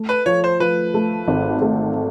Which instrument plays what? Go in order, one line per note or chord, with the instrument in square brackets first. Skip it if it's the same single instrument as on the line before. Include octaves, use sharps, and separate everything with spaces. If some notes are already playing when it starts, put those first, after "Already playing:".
Already playing: [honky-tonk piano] A3
[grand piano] B4
[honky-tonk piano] F3 [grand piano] C#5
[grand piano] C5
[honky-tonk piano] F3 [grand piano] B4
[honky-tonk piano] A3
G#1
A3